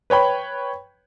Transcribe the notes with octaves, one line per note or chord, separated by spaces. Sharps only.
B4 C#5 G5 B5